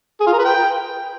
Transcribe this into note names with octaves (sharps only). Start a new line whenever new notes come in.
G#4
F4
A#4
B4
G5